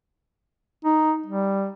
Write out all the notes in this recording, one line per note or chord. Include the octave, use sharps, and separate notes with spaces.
D#4
G3